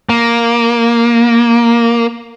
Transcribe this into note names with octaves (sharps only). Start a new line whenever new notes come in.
A#3